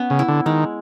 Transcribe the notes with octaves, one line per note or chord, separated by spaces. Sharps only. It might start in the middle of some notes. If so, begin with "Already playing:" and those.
Already playing: B3 C#4
C#3
E4
D3
D#3 G#3